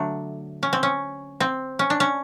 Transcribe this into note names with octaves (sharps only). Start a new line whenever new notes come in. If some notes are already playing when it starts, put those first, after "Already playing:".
Already playing: D3 F#3 A3 D4
C#4
C4
C#4
C4
C#4
D4
C#4